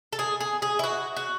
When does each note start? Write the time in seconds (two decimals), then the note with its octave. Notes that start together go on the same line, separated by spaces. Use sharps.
0.13 A4
0.19 G#4
0.40 G#4
0.62 G#4
0.79 E4
0.84 F#4
1.17 F#4